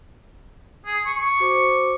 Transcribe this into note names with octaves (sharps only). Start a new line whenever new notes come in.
G#4
C#6
F#4 C5 D6